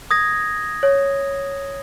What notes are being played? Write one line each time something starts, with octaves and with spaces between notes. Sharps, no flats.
D#6 G#6 A#6
C#5